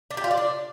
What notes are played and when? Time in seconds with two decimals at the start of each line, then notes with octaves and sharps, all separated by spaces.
0.11 D4
0.17 G4
0.24 F4
0.31 D5
0.37 D4